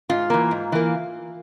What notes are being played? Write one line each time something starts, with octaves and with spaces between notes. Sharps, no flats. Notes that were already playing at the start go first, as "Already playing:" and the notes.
G#2 F4
E3 A#3
G#2
E3 A#3